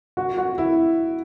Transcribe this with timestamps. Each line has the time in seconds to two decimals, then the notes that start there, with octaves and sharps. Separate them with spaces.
0.17 F#4
0.37 F#4
0.58 E4